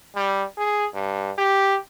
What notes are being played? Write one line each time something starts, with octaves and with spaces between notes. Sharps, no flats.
G3
G#4
G2
G4